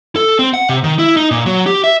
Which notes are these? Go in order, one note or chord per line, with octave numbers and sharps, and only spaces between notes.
A4
C4
F#5
C3
D#3
E4
D#4
A#2
F#3
G4
E5